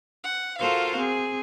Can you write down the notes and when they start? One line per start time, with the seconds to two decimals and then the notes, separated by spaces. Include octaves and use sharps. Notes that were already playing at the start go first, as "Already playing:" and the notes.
0.24 F#5
0.58 F4 F#4 A4 A#4 C5 F5
0.97 C4 G#4